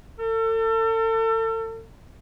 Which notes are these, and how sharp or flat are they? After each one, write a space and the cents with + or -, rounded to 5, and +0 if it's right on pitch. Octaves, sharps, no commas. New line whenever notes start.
A4 +35